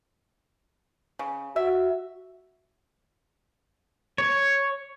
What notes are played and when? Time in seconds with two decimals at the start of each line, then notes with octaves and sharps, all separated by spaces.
1.19 C#3
1.56 F#4 E5
4.18 C#5